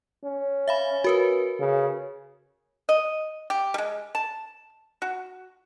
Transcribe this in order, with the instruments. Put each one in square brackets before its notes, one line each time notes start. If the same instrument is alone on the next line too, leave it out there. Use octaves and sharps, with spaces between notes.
[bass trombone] C#4
[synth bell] E5 F5 B5
F#4 A#4 B4
[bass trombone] C#3
[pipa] D#5
G4
G3 G#3
A5
F#4